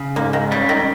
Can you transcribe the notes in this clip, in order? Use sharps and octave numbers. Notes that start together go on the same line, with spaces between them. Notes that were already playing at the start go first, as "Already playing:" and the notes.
Already playing: C#3
G#2 A#3
D#3
C#3 G3
D#3